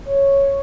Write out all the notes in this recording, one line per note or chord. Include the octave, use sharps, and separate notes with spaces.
C#5